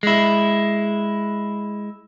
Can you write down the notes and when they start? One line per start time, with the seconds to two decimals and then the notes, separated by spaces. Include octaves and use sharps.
0.03 G#3 E4